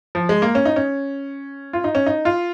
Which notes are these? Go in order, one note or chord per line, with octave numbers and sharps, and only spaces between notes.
F3
G#3
A#3
C#4
D#4
C#4
F4
D#4
C#4
D#4
F4